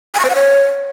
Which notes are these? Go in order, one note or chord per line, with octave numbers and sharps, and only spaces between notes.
G#5
C#6
C5
F#5
C#5